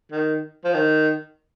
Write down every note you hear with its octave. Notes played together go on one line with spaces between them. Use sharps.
D#3
F3
D#3